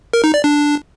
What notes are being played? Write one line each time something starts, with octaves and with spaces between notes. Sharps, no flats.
A#4
D#4
D5
D4